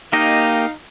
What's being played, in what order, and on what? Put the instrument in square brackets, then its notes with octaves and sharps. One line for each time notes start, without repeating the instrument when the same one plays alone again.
[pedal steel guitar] A#3 G4 D#5 [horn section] D#4 F5